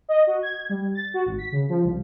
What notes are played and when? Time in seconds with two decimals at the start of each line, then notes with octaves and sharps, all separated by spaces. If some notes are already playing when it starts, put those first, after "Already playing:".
0.09 D#5
0.27 F#4
0.43 G#6
0.69 G3
0.95 A6
1.14 F#4
1.26 G#1
1.38 B6
1.52 C#3
1.69 F3
1.84 C2